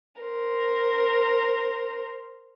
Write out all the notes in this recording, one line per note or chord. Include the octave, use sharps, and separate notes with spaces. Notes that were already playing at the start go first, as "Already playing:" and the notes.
A#4 C5